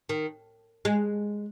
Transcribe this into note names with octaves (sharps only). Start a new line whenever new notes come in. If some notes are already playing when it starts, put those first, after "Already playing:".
D#3
G#3